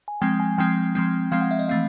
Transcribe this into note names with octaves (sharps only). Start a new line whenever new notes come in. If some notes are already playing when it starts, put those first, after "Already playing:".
G#5
F3 G#3 C4 G5
G#5
F3 G#3 C4 G5
F3 G#3 C4
F3 G#3 C4 F5
F#5
E5
D#5
E3 A3 C4 F5